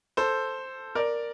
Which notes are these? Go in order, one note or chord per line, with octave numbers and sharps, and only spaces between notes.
A4 C5
A#4 D5